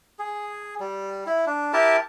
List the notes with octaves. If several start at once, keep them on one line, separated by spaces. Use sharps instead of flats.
G#4
G3
E4
D4
E4 G4 A#4 A5